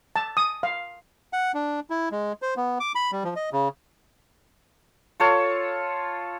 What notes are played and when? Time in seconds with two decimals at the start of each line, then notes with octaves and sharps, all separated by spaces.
0.16 A5
0.37 D#6
0.63 F5
1.33 F#5
1.54 D4
1.90 E4
2.11 G#3
2.42 C5
2.57 B3
2.80 D6
2.95 B5
3.12 G3
3.24 F3
3.36 D#5
3.53 C#3
5.20 F4 A4 C#5